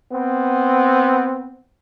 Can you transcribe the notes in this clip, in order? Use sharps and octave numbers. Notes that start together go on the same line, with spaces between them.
B3 C4